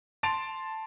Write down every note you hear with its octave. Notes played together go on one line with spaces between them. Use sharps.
A5 C6 A6 D7 F7